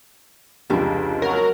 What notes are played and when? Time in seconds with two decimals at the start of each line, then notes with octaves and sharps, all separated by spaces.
0.70 F1 C#2 D4 G4 G#4
1.22 F#3 A#4